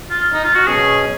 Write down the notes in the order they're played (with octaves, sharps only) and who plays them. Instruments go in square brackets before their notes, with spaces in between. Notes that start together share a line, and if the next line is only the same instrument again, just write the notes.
[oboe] F4
D#4
F4
F#4
[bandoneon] B2 F#3 C#4 [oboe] G#4